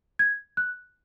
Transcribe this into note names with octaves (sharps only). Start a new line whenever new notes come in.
G#6
F#6